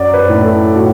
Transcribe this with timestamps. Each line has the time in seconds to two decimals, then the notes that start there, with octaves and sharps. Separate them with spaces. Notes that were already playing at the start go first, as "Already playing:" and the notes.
Already playing: F#2 F#3 D5
0.14 B4
0.29 A2
0.44 A4
0.75 A2 F#4